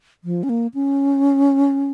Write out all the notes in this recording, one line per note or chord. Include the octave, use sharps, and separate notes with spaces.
F3
C#4
A#3
C#4